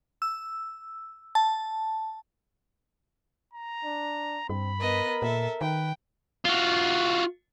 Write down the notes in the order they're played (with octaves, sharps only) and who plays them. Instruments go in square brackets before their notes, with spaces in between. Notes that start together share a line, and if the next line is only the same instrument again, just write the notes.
[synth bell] E6
A5
[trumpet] A#5
[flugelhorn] D4
[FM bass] G2 [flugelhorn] C4 [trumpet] B5
[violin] B3 D#5 [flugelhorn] A#4
[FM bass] A#2 [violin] A4 E5
[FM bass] D#3 [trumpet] B4 [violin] G5
[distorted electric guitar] F4 F#4